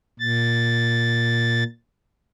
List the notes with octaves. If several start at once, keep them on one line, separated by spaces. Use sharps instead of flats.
A#2 A6